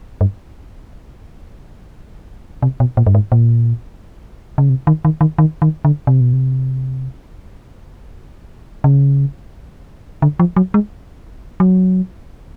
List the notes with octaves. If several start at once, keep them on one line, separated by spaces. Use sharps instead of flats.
G2
C3
B2
A#2
G2
G#2
A#2
C#3
C3
D#3
D#3
D#3
D#3
D#3
D3
C3
B2
C3
C#3
D3
F3
F#3
G#3
F#3